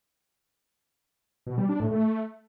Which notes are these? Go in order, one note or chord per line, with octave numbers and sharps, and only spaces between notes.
B2
G3
D4
A2
A3